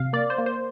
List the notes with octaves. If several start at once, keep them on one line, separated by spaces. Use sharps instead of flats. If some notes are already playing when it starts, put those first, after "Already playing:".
Already playing: C3 F5
A#3 D5
C5
A#3
C5